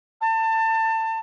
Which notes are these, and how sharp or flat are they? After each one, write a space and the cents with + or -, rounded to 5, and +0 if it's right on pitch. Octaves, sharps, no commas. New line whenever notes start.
A5 +25